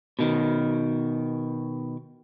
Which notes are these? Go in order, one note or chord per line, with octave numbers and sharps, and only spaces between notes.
B2 D#3